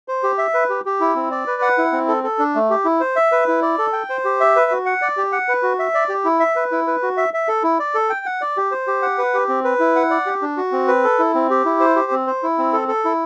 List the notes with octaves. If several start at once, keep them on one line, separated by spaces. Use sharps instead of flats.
C5
G4
E5
B4
G4
G4
E4
C4
D5
B4
F#5
E4
C4
A4
A4
D4
A3
G4
E4
C5
E5
B4
E4
D5
A4
G5
C5
G4
E5
B4
F#4
F#5
D5
G4
F#5
B4
F#4
E5
D5
G4
E4
E5
B4
E4
B4
F#4
E5
E5
A4
E4
D5
A4
G5
F#5
D5
G4
C5
G4
F#5
B4
G4
C4
B4
E4
F#5
D5
G4
D4
F#4
C4
B4
A4
E4
C4
G4
E4
C5
G4
C4
C5
E4
C4
A4
A4
E4